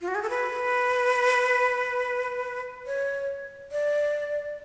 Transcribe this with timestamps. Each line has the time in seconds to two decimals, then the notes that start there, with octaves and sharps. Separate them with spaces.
0.01 F4
0.08 F#4
0.15 G#4
0.22 A4
0.30 B4
2.86 C#5
3.72 D5